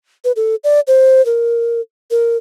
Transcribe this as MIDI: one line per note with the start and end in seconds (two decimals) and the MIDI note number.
0.24 0.32 71
0.36 0.55 69
0.64 0.80 74
0.87 1.24 72
1.26 1.81 70
2.11 2.37 70